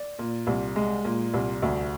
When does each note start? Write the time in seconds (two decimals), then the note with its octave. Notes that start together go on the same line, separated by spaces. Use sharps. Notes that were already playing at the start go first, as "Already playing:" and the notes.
Already playing: D5
0.19 A#2
0.47 C2
0.76 G#3
1.05 A#2
1.34 C2
1.62 D2